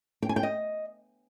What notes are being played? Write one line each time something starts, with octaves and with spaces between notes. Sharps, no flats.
G5
G#5
G5
D#5